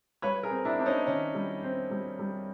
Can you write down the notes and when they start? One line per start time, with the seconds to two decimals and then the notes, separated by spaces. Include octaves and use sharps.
0.22 G3 B4 C#5
0.43 G#4 A#4
0.51 C4
0.65 D4 E4
0.79 C4 D4
0.86 C#4 D#4
1.07 D#3 C#4
1.35 G3
1.63 C4
1.91 G3
2.19 G3